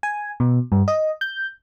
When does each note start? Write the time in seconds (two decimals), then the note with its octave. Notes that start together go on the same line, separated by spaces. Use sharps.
0.03 G#5
0.40 B2
0.72 G2
0.88 D#5
1.21 G6